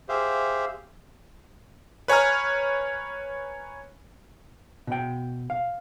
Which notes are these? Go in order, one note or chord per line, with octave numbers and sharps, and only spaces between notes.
G4 G#4 C5 E5 F5
B4 C#5 G#5 A#5 F6
B2 G5
F5